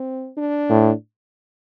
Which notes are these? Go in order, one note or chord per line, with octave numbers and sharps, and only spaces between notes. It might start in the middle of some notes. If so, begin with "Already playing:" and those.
Already playing: C4
D4
A2